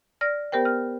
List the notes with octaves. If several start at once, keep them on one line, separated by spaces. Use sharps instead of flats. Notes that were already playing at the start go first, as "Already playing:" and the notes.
D5 F6 A#6
B3 G4 A#4 C5 G5
F6